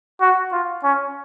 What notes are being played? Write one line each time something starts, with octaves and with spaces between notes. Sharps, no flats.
F#4
F4
C#4